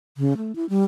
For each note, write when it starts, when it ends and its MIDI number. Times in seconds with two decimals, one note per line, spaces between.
0.17 0.37 49
0.37 0.55 57
0.55 0.68 64
0.69 0.84 55